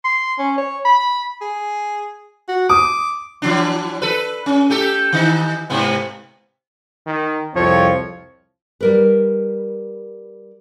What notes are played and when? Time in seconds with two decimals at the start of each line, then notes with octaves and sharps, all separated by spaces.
0.05 C6
0.39 C#4
0.58 C#5
0.85 B5
1.41 G#4
2.48 F#4
2.70 D6 D#6
3.42 E3 F#3 D4
4.02 A4 B4
4.46 C#4
4.70 A3 G4 A4
5.13 D#3 D#4
5.70 G#2 C3 B3
7.07 D#3
7.55 C2 F2 F3 C4 C#5
8.81 G3 A#4 B4